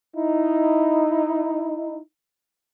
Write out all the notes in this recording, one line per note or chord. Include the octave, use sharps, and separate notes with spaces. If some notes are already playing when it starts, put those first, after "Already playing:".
D#4 E4